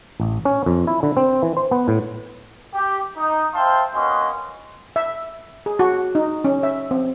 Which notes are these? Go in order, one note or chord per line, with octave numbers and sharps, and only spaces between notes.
A1
C#4
F2
E4
D3
C4
E3
C5
B3
A2
G4
D#4
C5 E5 F5 G5 A5 C6
A#3 B3 C#4 F#4 D#5 C6
E5
G#4
F#4
D#4
C#4
E5
C4